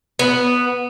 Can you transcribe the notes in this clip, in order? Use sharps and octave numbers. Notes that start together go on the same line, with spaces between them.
B3